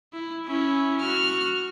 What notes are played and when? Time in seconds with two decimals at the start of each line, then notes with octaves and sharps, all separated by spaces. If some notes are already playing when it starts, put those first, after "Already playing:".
0.13 E4
0.46 C#4 E4
1.01 F#4 F6